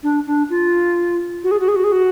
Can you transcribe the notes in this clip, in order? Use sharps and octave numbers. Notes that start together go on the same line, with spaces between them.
D4
D4
F4
F#4
G#4
F#4
G#4
F#4
G#4
F#4